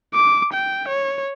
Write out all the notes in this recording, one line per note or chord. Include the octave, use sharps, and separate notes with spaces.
D6
G5
C#5